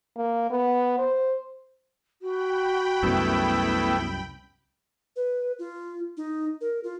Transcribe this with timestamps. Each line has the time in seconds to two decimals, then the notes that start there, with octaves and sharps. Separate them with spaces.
0.16 A#3
0.50 B3
0.98 C5
2.22 F#4 G5 B5
3.03 C2 F#2 A3 B3 E4
5.16 B4
5.59 F4
6.17 D#4
6.61 A#4
6.83 F4